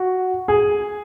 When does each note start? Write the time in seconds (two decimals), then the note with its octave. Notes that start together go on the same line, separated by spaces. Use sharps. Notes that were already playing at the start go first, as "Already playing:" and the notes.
Already playing: F#4
0.48 G#4